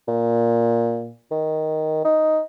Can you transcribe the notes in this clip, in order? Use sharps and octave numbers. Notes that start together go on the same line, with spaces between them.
A#2
D#3
D#4